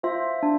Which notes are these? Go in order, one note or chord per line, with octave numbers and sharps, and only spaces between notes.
F4 C5 E5
D4